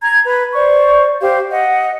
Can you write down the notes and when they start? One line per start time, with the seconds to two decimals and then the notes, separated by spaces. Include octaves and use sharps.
0.02 A#5 G#6
0.24 B4
0.54 C5 D5 C#6
1.20 G4 C5 F5
1.51 D#5 F#5